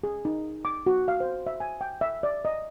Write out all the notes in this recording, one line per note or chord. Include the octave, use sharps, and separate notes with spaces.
G#4
D#4
D6
F#4
F5
C5
E5
G#5
G5
E5
D5
D#5